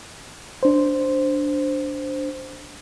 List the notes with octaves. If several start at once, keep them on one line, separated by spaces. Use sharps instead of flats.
D4 C5